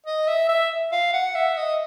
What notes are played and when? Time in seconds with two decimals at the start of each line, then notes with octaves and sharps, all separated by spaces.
0.06 D#5
0.28 E5
0.49 E5
0.92 F5
1.13 F#5
1.35 E5
1.57 D#5